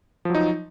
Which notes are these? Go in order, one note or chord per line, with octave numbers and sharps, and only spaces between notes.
F3 F#3 D#4